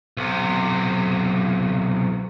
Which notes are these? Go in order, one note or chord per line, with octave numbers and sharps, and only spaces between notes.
B1 C3